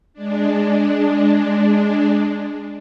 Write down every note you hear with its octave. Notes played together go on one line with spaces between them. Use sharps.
G#3 D4